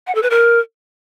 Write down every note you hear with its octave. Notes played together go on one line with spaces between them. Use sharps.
F#5
A4
B4
A#4